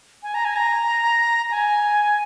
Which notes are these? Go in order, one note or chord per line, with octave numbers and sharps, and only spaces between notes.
G#5
A#5
G#5
A#5
G#5